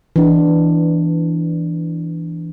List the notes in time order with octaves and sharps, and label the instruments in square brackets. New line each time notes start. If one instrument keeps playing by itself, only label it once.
[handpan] E3 D4